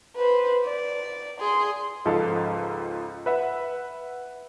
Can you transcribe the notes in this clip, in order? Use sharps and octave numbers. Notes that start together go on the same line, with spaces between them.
B4 C5
D5
G#4 C6
C#2 G#2 F3 A4 D#5 F5
B4 E5 F#5